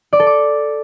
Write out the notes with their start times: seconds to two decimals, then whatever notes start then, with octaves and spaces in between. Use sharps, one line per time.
0.13 D5
0.20 A4
0.27 D6